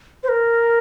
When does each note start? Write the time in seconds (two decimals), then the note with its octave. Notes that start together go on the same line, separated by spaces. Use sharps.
0.23 C5
0.29 A#4